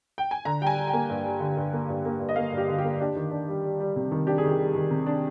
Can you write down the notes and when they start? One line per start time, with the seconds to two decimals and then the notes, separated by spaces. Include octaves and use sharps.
0.18 G5
0.31 G#5
0.45 D3 A#5
0.61 G3 G5
0.67 G#5
0.77 G3
0.87 G5
0.93 A#3
1.10 G2
1.24 G3
1.40 D3
1.57 G2
1.73 A#3
1.89 G2
2.05 A#3
2.20 G2
2.29 D#5
2.36 A#3 F5
2.53 G2 G4
2.68 D3
2.78 G4
2.85 A#3
3.00 D4 G4
3.16 D#3
3.31 D4
3.48 G3
3.64 G3
3.80 G3
3.96 C3
4.11 D#3
4.27 D4 G4
4.38 G#4
4.44 D#3
4.50 G4
4.60 G3
4.75 D#3
4.91 C3
5.06 D4